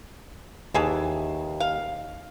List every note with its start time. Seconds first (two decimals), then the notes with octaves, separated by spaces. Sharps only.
0.74 D#2 E3 G#4 A5
1.60 F5